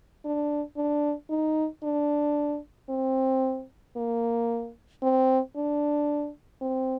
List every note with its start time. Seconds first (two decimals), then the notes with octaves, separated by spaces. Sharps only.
0.25 D4
0.77 D4
1.30 D#4
1.83 D4
2.89 C4
3.96 A#3
5.02 C4
5.56 D4
6.61 C4